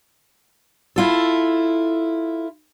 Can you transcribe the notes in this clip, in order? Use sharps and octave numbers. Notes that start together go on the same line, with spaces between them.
E4 F4 A4